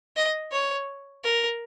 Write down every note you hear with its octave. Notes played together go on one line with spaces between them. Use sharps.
D#5
C#5
A#4